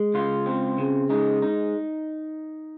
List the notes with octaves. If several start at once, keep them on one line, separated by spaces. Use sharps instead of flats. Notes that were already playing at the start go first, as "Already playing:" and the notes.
Already playing: G#3
C#2 F4
C4
C#3
G#3 D#4
D#4